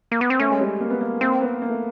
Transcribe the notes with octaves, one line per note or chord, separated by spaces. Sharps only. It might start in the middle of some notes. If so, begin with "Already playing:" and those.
A#3
B3
C4
A3 C#4
G#3
G3
A#3
B3
A#3
A#3 C4
B3
A#3
A3